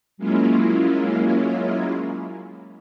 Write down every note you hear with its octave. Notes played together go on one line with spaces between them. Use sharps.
F#3 G#3 A#3 C#4 E4 F4